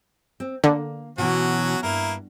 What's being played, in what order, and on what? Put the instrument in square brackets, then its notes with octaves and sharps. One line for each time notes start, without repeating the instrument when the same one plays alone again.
[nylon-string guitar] C4
[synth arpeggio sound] D3 [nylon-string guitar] A#3
[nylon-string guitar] B2 E3 [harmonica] F#3 C#4 F#4
[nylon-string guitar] G2 [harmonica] A#3 E4 A#4